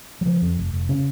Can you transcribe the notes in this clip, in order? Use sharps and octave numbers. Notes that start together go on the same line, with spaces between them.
F#3
C#3 F3
F2
F1
F1
C#3 C#4